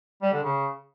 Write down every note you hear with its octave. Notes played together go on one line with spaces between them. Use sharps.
G3
D3
C#3